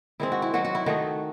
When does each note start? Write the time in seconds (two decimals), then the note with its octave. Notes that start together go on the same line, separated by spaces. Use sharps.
0.20 D#3 G#3 C4 E4
0.32 F#4
0.42 E4
0.53 D#3 F#3 C4 F#4
0.65 F#4
0.75 E4
0.86 D#3 A3 D#4 F#4